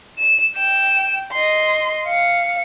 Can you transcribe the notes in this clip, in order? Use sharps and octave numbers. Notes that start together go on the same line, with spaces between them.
E7
G5 E7
D#5 C6
F5 C#7